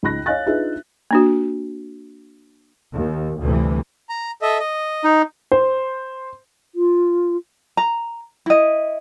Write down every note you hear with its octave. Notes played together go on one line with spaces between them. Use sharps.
C#2 D#4 B5 F#6 A#6
C#5 D#5 F5 G#5 F#6 A6
D4 D#4 F4 G#4 B4 E5
A#3 D4 F#4
D#2
D2 G2 C3 E3
A#5
A4 D#5 E5
D#5
D#4
C5
F4
A#5
E4 D#5